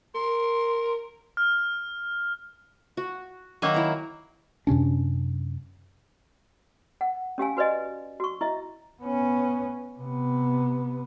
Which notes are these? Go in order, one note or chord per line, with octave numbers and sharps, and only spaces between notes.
A#4 C6
F6
F#4
D#3 F#3 A#3 G#5
E4 A#5
F#2 C3 C#4 D4
F#5
C#4 G4 F5 G#5
F#4 B4 D5 D#5 G#5
F#4 C#6
E4 D#5 E5
B3 C#4
C3 B3